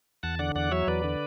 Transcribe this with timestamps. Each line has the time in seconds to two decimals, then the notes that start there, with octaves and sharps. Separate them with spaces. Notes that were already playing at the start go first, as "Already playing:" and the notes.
0.23 E2 F#5 A5
0.39 D3 D5 F#5
0.55 E2 D5 F#5
0.71 F#3 C#5 E5
0.87 E2 B4 D5
1.04 D3